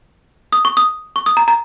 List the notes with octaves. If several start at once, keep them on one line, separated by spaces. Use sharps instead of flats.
D#6
C#6
D#6
C#6
D#6
A#5
A#5